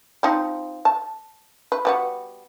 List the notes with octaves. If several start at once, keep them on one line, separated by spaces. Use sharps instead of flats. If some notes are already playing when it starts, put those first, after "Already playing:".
F3 C4 D#4
A5
B4
G3 B3 F#4